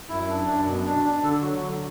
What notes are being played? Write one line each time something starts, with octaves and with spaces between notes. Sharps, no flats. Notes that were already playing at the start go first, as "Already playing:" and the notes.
F#2 E4
D4
F#2
B2
D4
D4
D3 A4
F#3 F#4
D3